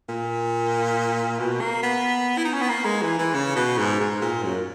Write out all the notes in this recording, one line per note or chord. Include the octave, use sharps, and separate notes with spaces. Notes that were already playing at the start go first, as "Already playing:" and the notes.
A#2
B2
A#3
B3
E4
D#4
C#4
B3
A#3
G#3
E3
E3
C#3
B2
G#2
G#2
A#2
F#2